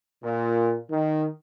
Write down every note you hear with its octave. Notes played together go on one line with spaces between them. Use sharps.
A#2
D#3